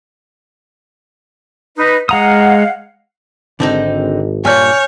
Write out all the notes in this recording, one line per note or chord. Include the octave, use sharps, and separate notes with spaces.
D#4 B4
G#3 F5 F#5 A#5 D#6
G#1 D3 C4 D#4
G2 A#2 C#5 G#5 F6 G6